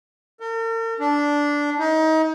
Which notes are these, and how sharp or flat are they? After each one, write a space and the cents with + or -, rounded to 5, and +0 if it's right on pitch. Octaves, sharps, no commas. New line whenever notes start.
A#4 -45
D4 -10
D#4 +30